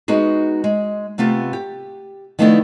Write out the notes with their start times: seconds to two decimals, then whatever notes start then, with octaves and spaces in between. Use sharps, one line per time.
0.08 G#3 B3 D#4 F#4 G#4
0.64 G#3
1.18 C3 A3 B3 F4 G4
1.53 G4
2.39 D#3 F3 A3 B3 D4 E4